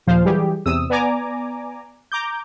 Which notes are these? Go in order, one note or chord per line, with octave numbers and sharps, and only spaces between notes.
D#2 A#2 F3 C5 F5
E3 F#3 G3 G4 G#4
E2 C3 D#6 E6
B3 D5 G#5 A#5 D6
A#5 D6 G6